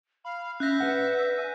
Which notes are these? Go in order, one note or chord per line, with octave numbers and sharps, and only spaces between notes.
F5 B5
C#4 E5 F#6 G6 A#6
D4 B4 F#5
G#5